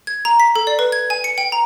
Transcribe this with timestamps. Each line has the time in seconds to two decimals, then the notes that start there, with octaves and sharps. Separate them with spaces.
0.07 G#6
0.25 A#5
0.40 B6
0.56 A4
0.67 D5
0.79 B4
0.92 G#6
1.10 G#5
1.24 C#7
1.38 G5
1.52 A#5